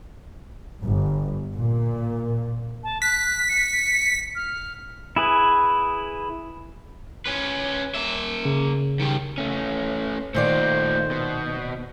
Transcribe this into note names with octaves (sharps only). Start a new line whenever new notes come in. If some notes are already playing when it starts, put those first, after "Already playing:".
G1
A#2
A5
F#6 B6
C#7
F6
E4 G#4 B4
C#4 B4
A#3 E5
C#3
D#3 G3
A3 C#4
A#2 D#3 A3 F4 C5 D5
B2